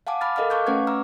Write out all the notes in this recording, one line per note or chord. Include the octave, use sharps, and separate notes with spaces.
F5 F#5 G#5 A5 D6
A5 B5 D6 F6 A6
A4 A#4 D#5 F5 D6 F6
F5 A5 C#6 D6 F#6 G6
A3 C#4 B4 F#5 C#6 G#6
A#5 D6 E6 F6